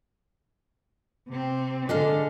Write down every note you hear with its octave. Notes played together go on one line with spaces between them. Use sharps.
C3 C4
D3 G#3 D4 A4 F5